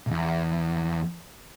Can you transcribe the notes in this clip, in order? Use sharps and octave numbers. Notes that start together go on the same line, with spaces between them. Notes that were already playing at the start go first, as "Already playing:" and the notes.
B1 E2